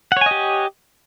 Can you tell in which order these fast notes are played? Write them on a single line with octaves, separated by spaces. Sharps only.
F#5 C#5 G#5 D#5 G4